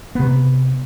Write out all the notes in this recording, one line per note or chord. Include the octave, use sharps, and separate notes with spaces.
C3 B3